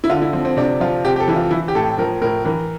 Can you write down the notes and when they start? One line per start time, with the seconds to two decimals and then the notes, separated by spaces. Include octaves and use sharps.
0.04 E4
0.10 D3 F4
0.22 E4
0.33 F3 C4
0.45 C4
0.57 C3 D4
0.80 F3 F4
1.05 C3 G4
1.16 G4
1.20 A4
1.28 E3 E4
1.36 F4
1.51 E3 E4
1.68 G4
1.75 A2 A4
1.98 F3 A#4
2.22 A2 A#4
2.45 E3 A#4